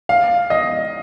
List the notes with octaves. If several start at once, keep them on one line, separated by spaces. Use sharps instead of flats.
F5
D#5